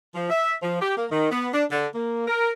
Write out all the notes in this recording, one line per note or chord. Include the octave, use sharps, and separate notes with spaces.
F3
E5
F3
G4
A#3
D#3
B3
D4
D3
A#3
A#4